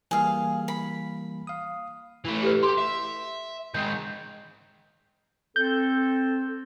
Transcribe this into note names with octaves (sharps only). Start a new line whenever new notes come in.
E3 G3 A#3 G#4 F5
B5
F5 D#6
E3 A3
G4 A4 B4
G4 C6
E5
D#3 G#3 G6
C4 A4 G6